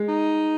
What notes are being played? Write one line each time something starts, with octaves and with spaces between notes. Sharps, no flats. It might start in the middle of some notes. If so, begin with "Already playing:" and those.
Already playing: G#3
D#4